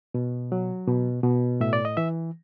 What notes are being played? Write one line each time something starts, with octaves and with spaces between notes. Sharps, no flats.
B2
F#3
B2
B2
A2 E5
D5
D#5
E3 E5